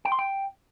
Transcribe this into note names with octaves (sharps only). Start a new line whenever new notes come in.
G5
C6
G5